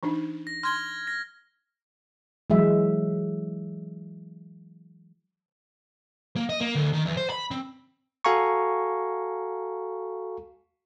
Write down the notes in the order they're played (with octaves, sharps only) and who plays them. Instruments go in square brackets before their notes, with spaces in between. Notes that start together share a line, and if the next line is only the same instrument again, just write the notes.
[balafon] E3 D4 D#4
[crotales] A#6
[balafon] C6 [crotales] F6 G#6 G7
[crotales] A#6
[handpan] E3 F#3 G#3 E5
[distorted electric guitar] A#3
D#5
A#3
D2
D#3
E2
C5
B5
C4
[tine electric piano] F#4 A4 F5 G#5 A#5 C#6